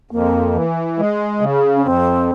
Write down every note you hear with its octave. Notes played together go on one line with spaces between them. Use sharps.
F2 A#3
E3
G#3
C#3
C#4
F2 C4